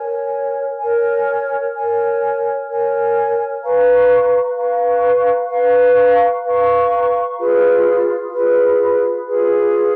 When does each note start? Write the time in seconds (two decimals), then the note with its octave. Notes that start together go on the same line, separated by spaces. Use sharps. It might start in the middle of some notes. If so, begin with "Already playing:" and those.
Already playing: A#4 C#5 G#5
0.79 A#4 C#5 G#5
1.74 A#4 C#5 G#5
2.68 A#4 C#5 G#5
3.62 B4 F5 A#5 C#6
4.56 B4 F5 A#5 C#6
5.50 B4 F5 A#5 C#6
6.44 B4 F5 A#5 C#6
7.38 F4 G#4 B4
8.32 F4 G#4 B4
9.26 F4 G#4 B4